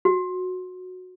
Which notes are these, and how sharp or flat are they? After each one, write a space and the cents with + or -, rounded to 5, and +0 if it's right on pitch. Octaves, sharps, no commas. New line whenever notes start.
F#4 -15